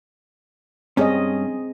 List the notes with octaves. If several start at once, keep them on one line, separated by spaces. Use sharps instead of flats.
G2 C4 C#4 G#4 D#5